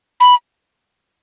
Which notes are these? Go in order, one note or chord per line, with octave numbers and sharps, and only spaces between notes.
B5